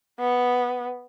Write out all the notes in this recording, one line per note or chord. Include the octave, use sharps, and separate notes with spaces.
B3